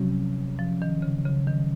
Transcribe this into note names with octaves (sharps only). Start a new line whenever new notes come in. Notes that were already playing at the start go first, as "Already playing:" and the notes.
Already playing: C3 F3 F#3 C#4
F3
D#3
C#3
C#3
D#3